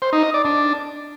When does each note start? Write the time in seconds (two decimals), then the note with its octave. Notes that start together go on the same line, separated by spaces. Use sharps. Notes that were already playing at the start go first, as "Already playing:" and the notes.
0.02 C5
0.13 D#4
0.23 D#5
0.34 D5
0.45 D4